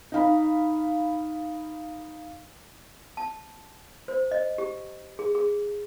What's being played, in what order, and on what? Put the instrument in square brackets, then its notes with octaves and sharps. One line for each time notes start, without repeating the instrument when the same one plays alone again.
[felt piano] D#4 F5 B5
[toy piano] A5
C5
D#5
G4
G#4
G#4